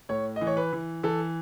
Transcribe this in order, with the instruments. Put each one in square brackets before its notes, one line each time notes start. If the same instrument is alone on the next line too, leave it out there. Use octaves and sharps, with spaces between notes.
[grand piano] A2 C#5
D#5
E3
C#5
B4
E3
E3 A4